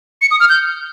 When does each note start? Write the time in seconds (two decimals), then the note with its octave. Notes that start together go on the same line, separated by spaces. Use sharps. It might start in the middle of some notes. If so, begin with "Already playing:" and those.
0.22 C#7
0.31 D#6
0.40 F6
0.49 G6